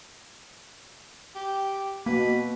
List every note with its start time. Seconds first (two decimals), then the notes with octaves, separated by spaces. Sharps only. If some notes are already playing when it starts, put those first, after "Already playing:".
1.35 G4
2.06 B2 A#3 B4